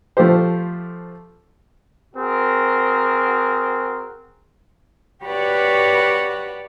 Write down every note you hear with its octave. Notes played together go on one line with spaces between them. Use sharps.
F3 A3 G4 C5
C4 F#4 G#4 A#4
F#4 G4 B4 C#5 D5 F#5